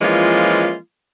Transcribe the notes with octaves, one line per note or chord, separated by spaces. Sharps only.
E3 F3 G#3 A#3 C#4 F4